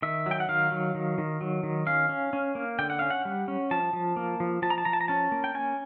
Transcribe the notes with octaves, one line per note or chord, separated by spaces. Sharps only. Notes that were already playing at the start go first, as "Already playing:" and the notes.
D#3 E5
F#3
G5
F#5
D#3 F5
F#3
D#3
D#3
F#3
D#3
C#4 F5
C#4
C#4
A#3
D3 G5
F#5
C#4 F5
F#5
G3
C#4
F3 A5
F3
A#3
F3
F3 A5
A#5
A5
F3 A#5
A5
A#5
C#4 A5
A#3
G5
C#4 G#5